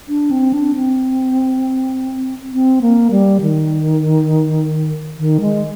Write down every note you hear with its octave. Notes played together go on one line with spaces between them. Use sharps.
D4
C4
D4
C4
C4
A#3
G3
D#3
D#3
G#3